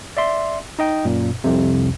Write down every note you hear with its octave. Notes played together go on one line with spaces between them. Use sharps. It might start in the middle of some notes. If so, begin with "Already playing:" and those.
D5 E5 C6
D#4 D#5 G5
F#2 A#2
C2 F2 C3